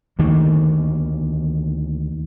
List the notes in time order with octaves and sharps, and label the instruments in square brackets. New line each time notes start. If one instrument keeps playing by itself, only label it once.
[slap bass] D2 D#3 A3 A#3